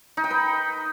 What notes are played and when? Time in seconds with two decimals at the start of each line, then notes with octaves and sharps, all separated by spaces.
0.17 D#4
0.24 G5
0.31 B4